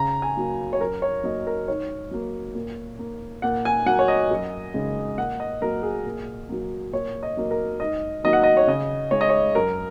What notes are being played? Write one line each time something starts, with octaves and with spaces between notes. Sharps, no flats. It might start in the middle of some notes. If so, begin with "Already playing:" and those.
Already playing: C#3 A#5
G#5
F#3 A#3
C#5
F#2 A#4
C#5
F#3 A#3 D#5
A#4
G#2 C#5
F#3 A#3
A#2
A#3
A#2 F#5
G#5
F#3 A#3 F#5
C#5
D#5
F#2
C#3 G#3
A#2 F#5
D#5
F#3 A#3 A#4
G#4
A#2
F#3 A#3
A#2 C#5
D#5
F#3 A#3
A#4
G#2 D#5
D#3 F#3 A#3 D#5
F#5
D#5
C#5
C#3 D#5
G#3 C#5
D#5
C#5
F#2 A#4